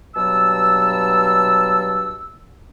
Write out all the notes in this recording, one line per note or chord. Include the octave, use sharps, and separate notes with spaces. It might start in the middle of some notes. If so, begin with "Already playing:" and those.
G2 B2 F#3 A5 E6